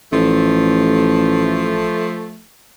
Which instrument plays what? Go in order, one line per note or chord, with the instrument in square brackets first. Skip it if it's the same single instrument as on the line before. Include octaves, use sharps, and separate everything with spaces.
[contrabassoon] A1 [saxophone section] F3 A3